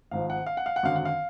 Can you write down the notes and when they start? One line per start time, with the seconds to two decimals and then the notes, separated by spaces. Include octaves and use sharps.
0.11 G#1 G#2 F3 F5
0.30 F#5
0.46 F5
0.57 F#5
0.66 F5
0.76 F#5
0.83 G#1 F#2 D3 F#3 F5
0.96 F#5
1.05 F5